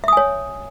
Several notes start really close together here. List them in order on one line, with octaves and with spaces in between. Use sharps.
E5 D#6 G#5 C#5